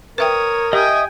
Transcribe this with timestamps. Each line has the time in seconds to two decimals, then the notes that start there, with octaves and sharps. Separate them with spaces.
0.18 A#4 B4 C#5 E5 G5 D#6
0.73 G4 D#5 E5 G5 G#5 D#6